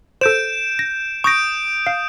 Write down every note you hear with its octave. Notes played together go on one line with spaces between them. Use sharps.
A4 C5 G6 D7 E7
A#6
C#6 D#6 G6 A#6 D7
F5